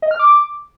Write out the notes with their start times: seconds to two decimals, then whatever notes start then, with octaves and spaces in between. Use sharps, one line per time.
0.02 D#5
0.11 F6
0.19 D6